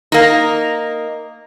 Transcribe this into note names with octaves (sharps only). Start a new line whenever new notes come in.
A#3 D#4